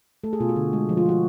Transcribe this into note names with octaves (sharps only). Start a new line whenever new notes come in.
A3 A4
G#4
B2 F4
F#4
D3
G#3
F3
F4
F3 F#4